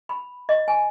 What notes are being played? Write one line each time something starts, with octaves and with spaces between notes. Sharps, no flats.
B5
D#5
G#5